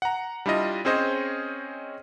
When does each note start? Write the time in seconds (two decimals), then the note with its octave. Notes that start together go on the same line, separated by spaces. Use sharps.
0.02 F#5 A#5
0.46 G3 D4 E4 F4 D#5
0.85 C4 C#4 G#4 C5 C#5 D#5